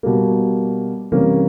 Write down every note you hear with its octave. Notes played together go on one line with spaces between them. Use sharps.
B2 G3 A#3
C3 E3 G3 A#3 C#4